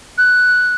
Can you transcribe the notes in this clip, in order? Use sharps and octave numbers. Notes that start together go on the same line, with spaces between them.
F#6